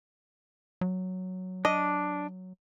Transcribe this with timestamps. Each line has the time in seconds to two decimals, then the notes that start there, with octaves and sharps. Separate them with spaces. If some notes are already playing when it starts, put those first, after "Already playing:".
0.81 F#3
1.65 D4 D#5